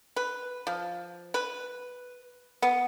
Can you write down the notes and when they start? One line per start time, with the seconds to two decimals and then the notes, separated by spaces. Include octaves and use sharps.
0.16 B4
0.67 F3
1.34 B4
2.62 B3